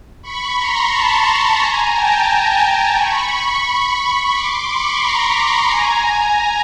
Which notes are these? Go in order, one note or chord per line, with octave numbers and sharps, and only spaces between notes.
B5 C#6
A#5 C6
A5 B5
G#5 A#5
G5 A5
G#5 A#5
B5 C#6
C6 D6
B5 C#6
A#5 C6
G#5 A#5